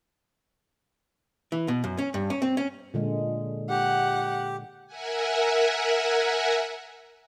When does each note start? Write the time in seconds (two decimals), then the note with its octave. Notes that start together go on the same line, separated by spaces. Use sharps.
1.52 E3
1.68 B2
1.84 F#2
1.98 C#4
2.14 G2
2.30 C#4
2.42 C4
2.57 C#4
2.94 A#2 D3 G#3
3.69 G4 F#5
4.86 A#4 E5 F#5 G#5